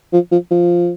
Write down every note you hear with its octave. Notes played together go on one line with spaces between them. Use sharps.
F3
F3
F3